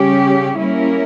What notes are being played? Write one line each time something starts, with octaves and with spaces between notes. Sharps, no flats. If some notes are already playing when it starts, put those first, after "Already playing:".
Already playing: C#3 G3 C#4 G4
G3 A#3 C#4 E4 A#4